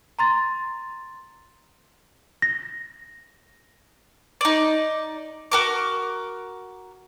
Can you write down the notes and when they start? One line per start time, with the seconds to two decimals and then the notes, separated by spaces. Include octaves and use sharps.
0.19 A#5 C6 A6
2.42 A#6
4.41 D#4 D5
5.52 F#4 A#4 D6